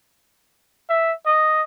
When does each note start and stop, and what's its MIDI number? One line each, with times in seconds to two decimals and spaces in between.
0.89 1.12 76
1.26 1.62 75